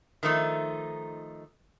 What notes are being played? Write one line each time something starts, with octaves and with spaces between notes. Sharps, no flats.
D#3 F3 A3 D#4